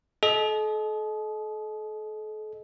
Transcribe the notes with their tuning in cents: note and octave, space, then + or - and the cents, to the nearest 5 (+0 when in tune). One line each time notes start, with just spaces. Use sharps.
A4 -40 D#5 +0